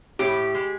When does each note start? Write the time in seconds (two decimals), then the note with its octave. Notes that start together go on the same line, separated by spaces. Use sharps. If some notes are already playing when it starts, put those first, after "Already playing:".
0.19 A2 G4
0.54 G#3